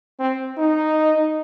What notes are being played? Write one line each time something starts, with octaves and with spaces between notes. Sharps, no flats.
C4
D#4